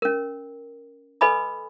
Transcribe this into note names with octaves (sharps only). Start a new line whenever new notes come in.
C#4 A#4
A4 B4 D#5 G#5 B5 D#6